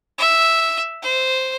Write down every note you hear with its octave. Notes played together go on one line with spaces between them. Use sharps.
E5
C5